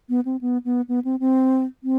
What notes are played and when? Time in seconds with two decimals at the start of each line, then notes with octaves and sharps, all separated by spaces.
0.09 B3
0.25 C4
0.41 B3
0.65 B3
0.88 B3
1.05 C4
1.20 C4
1.84 C4